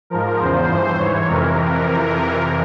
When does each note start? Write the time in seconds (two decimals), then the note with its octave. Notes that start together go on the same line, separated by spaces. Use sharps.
0.10 G#2 F3 A#4
0.39 E2 C#3 F3 C5
0.69 G2 E3 C5
0.98 G#2 E3 C#5
1.27 F2 C3 E3 A#4